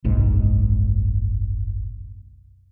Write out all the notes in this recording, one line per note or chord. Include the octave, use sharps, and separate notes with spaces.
F#1 B1 G#2